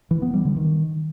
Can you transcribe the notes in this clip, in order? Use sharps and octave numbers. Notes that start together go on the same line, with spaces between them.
E3
B3
G3
D3
D#3